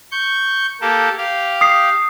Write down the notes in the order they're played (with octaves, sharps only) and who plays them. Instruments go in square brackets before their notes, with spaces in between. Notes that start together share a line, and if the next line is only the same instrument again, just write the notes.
[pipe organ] C#6 G6
A#3 G4 A4
G4 F5
[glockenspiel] D#6 C7